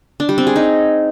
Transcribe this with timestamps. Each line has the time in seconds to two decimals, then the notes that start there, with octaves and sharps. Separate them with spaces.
0.20 D4
0.29 G3
0.38 C4
0.47 G#4
0.56 D#4